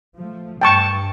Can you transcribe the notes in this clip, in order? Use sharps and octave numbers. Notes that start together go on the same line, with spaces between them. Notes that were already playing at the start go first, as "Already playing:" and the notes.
F3 A3
G2 G5 A5 C#6